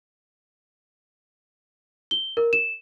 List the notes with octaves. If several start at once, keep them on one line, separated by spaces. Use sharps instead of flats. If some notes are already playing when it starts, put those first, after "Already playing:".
G7
A#4
E7